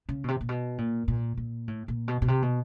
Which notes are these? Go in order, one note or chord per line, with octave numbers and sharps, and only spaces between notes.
C#3
B2
C3
A#2
B2
A#2
A#2
A#2
A2
A#2
B2
B2
C3
B2